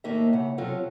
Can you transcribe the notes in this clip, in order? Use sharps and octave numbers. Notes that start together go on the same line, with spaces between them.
D#2 A2 A3 A#3 D#4 E5
C#3 F#5
E2 C3 F#3 F4 A4 C#5